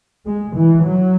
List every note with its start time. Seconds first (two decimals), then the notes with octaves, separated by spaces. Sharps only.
0.26 G#3
0.55 E3
0.85 F#3